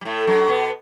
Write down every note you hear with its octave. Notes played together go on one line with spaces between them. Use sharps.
G3
A2 A3
F#2 F#3
B2 B3